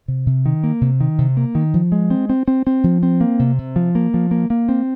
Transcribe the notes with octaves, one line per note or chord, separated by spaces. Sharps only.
C3
C3
D#3
A#3
C3
D#3
C3
A#3
D#3
F3
G#3
C4
C4
C4
C4
F3
C4
A#3
C3
C3
F3
A#3
F3
A#3
A#3
C4